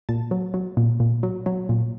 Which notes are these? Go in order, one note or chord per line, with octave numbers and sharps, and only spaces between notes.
A#2 A5
F#3
F#3
A#2
A#2
F#3
F#3
A#2